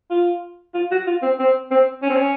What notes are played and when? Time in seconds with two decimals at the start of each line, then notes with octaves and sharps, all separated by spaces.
0.11 F4
0.74 F4
0.91 F#4
1.07 F4
1.22 C4
1.39 C4
1.71 C4
2.02 C#4
2.10 C4
2.17 C#4